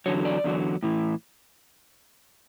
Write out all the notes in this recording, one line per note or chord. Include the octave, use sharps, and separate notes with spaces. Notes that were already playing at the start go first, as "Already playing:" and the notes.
E2 D3 F#3 C#5
D5
E2 D3 F#3
A2 E3